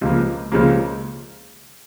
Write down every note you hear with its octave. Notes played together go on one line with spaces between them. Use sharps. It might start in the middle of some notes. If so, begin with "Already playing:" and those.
C#2 C#3 F3 A#3
C#2 C#3 F3 A#3